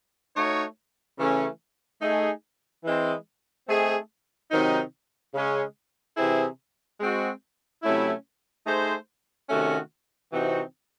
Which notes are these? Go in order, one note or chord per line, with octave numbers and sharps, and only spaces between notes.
A3 D#4 F#4 C#5
C#3 E3 A3 C#4
A3 D#4 G#4
E3 G#3 C4
A3 C4 D#4 G#4
C3 D#3 F#3 C4 D#4
C#3 G#3 C#4
C3 E3 C4 E4 G#4
G#3 C4 F#4
C3 F#3 A3 C#4 E4
A3 D#4 G#4 C5
C3 D#3 A3 C#4 F#4
C3 E3 C4 D#4 F#4